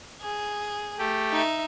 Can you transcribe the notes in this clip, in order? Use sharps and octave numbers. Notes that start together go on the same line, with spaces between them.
G#4
A3 G4
D#4 E5